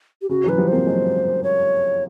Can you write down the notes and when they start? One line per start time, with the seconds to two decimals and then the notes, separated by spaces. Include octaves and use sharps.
0.22 G4
0.29 C#3 F#4
0.44 E3 F#3 B4
0.58 F3 G3
0.68 A#3 C4 C5
0.86 F#3 G#3
1.44 C#5